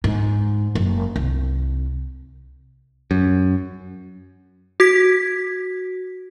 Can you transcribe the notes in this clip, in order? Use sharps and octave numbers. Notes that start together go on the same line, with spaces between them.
G#2
F#1
C2
F#2
F#4 G#6 B6